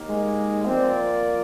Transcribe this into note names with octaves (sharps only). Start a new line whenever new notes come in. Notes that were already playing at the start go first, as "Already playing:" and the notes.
Already playing: D#2 D#3 A#3
G#3
F3 A#3 C4 F4 A#4 D5